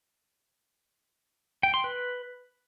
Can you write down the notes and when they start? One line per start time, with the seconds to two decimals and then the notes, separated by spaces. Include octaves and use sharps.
1.63 G5
1.74 C6
1.84 B4